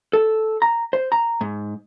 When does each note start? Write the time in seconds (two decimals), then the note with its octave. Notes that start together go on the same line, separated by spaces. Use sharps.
0.13 A4
0.62 A#5
0.93 C5
1.12 A#5
1.41 G#2